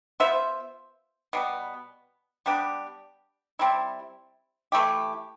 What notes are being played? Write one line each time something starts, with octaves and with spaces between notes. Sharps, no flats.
B3 F4 C5 E5
B2 G3 B3
G3 B3 D4 G4
G3 C4 E4
E3 A3 E4 G4